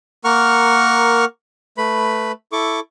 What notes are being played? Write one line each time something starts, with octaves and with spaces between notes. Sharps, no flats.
A#3 A#4 F#5 C#6 F6
A3 B4 B5
E4 A4 C#6 D6